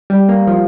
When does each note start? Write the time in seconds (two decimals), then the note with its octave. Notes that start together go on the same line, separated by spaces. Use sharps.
0.10 G3
0.29 A#3
0.47 F3